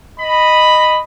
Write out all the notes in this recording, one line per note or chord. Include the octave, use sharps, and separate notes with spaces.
D#5 B5